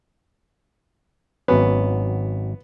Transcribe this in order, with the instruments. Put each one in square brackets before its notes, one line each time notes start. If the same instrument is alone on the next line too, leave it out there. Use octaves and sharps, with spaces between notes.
[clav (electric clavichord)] G#1 F#3 C#4 [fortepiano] B3